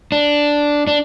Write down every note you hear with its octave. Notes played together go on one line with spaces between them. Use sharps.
D4
D4